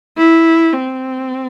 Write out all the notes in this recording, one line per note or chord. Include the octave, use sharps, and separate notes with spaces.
E4
C4